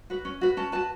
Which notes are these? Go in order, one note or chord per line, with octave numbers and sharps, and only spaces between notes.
F#4 B4
C#4
F#4 B4
C#4 A5
F#4 B4 A5